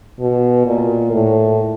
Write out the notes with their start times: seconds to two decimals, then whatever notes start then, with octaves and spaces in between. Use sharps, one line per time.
0.20 B2
0.66 A#2
1.12 A2